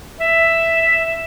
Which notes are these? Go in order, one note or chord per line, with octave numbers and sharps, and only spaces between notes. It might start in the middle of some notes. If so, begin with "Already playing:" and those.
E5